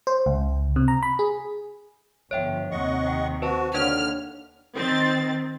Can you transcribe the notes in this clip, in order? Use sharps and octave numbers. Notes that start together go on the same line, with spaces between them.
C5
C#2
C3
A#5
B5
G#4
G1 F3 C#5 E5 G5
D#2 C3 D#5 F#5 C#6
G5
F#4 B4 C5 A5
D#2 D3 D4 C#5 F#5 F6
D#3 C4 A6